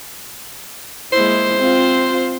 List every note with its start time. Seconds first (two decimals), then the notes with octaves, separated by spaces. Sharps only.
1.13 G#3 A#3 E4 C5
1.58 C4 F4